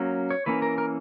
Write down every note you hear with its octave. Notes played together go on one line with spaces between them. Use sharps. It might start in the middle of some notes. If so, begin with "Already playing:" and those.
Already playing: F#3 A#3 C#4
C#5
E3 A#3 C#4 B4
A#4
A#4